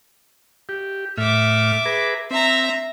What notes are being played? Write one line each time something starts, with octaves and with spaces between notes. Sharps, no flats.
G4
A2 E5 D6 F6
G#4 B4 A#5
C4 E5 A#5